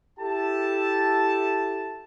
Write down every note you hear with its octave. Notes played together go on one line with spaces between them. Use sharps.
E4 G4 A4 A5